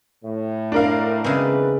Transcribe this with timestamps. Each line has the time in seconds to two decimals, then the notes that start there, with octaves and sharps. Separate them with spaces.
0.23 A2
0.72 D4 A#4 F5
1.24 B1 C#3 E3 G#3 C4 B4